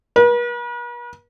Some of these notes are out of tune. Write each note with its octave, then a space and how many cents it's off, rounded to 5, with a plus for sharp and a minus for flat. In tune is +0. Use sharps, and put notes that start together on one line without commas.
B4 -45